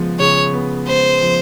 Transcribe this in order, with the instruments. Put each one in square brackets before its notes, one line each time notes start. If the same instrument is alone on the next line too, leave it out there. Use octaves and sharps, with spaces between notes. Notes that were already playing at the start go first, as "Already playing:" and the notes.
Already playing: [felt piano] C#3 F3 G#3 B3
[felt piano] C#3 [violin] C#5
[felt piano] B3
[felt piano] G#3 [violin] C5
[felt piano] F3